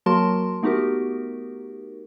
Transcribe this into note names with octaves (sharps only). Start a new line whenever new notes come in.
F#3 A#3 F#4 A#4 A5 C6
A3 B3 D#4 F#4 G4 A#4